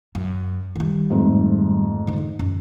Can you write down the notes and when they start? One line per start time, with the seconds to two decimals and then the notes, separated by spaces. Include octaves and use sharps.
0.15 F#2
0.76 D#3 G3
1.10 F2 G#2 A3
2.07 D3 D#4
2.39 F#2